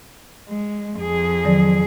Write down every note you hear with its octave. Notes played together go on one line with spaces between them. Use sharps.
G#3
F2 G#4
D#3 F#3 D5